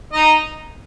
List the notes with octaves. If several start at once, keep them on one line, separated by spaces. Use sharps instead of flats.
D#4 D#5